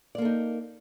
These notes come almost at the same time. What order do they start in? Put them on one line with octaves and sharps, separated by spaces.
D5 A#3 A4 D#4